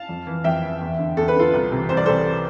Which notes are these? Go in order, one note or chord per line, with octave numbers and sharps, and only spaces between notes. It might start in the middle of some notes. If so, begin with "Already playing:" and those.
Already playing: F5 A5
F2
E3
F2 E5 G5
E3
E2
D3
E2 A4
B4
D3 F4 A4
C2
C3 E3
C2 C5
D5
C3 E3 A4 C5